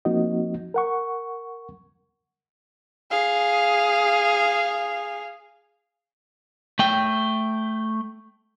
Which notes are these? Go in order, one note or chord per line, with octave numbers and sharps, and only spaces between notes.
F3 A#3 C4 D#4 F#4 D#5
A#4 F#5 C#6
G#4 F5
A3 G5